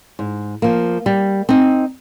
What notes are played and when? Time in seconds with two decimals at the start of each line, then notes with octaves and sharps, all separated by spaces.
0.19 G#2
0.62 F3 A#3
1.06 G3
1.49 C4 D#4